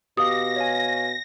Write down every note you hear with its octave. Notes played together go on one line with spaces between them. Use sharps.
B2 G4 F5 D#6 A#6
C#5 F5 G#5